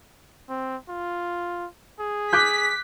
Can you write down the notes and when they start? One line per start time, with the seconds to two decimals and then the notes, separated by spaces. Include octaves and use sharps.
0.49 C4
0.89 F4
2.00 G#4
2.33 D6 F#6 G6 B6